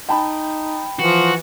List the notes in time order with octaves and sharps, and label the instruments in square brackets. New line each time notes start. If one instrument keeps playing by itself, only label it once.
[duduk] D#4 [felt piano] G5 A5 B5
[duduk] E3 [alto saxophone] F3 [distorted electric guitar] F#4